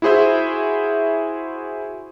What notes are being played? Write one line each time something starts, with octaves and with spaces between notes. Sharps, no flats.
E4 F#4 G#4 C5 E5